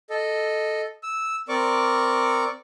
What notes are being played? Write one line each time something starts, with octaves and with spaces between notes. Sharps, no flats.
A4 D#5
E6
C4 A#4 D5 C#6 D6